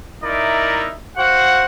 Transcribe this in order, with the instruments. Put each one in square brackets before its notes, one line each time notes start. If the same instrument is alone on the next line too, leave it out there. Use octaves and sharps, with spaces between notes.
[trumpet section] D#4 E4 A#4 D5 E5
F#4 C5 F5 F#5